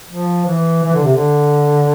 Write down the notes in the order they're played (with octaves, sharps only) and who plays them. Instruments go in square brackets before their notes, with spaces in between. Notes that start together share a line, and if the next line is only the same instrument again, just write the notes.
[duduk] F3
E3
E3
D3
C3
D3